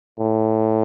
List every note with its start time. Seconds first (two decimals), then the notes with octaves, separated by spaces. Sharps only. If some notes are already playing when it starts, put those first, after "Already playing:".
0.19 A2